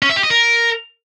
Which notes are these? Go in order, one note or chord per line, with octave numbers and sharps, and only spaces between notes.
C#4
E5
G4
D#5
A#4